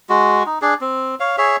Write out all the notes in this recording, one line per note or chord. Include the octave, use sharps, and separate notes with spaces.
G#3 F#4
D#4
D4 G#4
C4
C#5 F5
G#4 C#5 E5